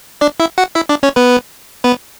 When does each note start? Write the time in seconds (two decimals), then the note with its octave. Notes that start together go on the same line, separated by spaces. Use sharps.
0.21 D4 D5
0.40 E4 E5
0.58 F#4 F#5
0.75 E4 E5
0.89 D4 D5
1.03 C#4 C#5
1.16 B3 B4
1.84 B3 B4